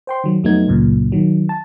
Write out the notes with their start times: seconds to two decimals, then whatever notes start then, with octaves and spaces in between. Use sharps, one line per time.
0.07 C5 G5 C6
0.24 D#3 F#3
0.44 F2 F#3 A3 B3 D#4 G#6
0.68 C#2 F#2 A#2
1.12 D#3 F#3
1.49 A5